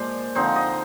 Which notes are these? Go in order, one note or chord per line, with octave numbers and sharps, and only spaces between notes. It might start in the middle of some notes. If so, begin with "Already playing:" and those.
Already playing: A#2 F3 G#3 C5 D5
D3 F3 C4 D#4 C5
D#5